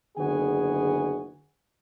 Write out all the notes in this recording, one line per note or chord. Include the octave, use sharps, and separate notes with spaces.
F#1 D3 B3 F#4 G#4 G#5